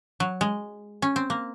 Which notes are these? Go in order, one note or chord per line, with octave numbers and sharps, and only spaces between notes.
F#3
G#3
C#4
C4
A#3